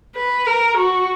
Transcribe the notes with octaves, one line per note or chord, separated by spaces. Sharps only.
B4
A#4
F#4